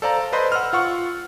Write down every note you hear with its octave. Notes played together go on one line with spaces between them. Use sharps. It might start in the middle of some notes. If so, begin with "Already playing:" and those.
A4 C5 D5 F5 A5 A#5
B4 C5 D#5 B5 C6
F#5 E6 F6
F4 F#5 C#6